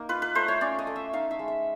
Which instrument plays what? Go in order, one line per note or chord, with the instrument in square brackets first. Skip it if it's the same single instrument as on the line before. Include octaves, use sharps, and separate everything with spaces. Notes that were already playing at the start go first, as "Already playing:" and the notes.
Already playing: [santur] A#3 D#4
F4 B4
B4
A3 C5
C#5
C#4 D5
D#5
A3
E5
D#4 F5
E5
G#3
E5